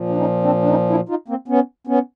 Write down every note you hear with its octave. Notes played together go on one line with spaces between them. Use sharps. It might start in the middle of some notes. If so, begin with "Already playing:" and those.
Already playing: A#2 F3
D4
C#4 D#4
C4 D4
D4
C#4 D#4
D4 E4
D#4 F4
A#3 C4
B3 C#4
B3 C#4